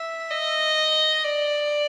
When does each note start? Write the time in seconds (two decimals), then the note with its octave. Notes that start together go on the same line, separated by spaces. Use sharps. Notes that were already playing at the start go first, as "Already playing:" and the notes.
Already playing: E5
0.31 D#5
1.24 D5